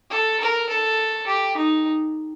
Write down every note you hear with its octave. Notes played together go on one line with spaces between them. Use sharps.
A4
A#4
A4
G4
D#4